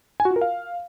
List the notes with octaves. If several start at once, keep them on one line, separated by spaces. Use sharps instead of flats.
G#5
F#4
F4
A#4
F5